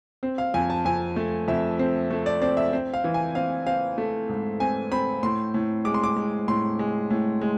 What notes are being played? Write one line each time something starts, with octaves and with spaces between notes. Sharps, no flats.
C4
F5
F2 G#5
A5
F2 G#5
A3
F2 E5
C4
A3
D5
C4 D5
E5
C4
F5
E3
G#5
C4 F5
C4 F5
A3
G#2
C4 G#5
C4 B5
A2 C6
A2
G#3 D6
C6
D6
G#3
A2 C6
G#3
A2
G#3